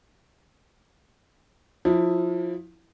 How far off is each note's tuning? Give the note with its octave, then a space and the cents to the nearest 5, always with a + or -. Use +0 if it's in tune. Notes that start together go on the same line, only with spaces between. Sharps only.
F3 +25 E4 +0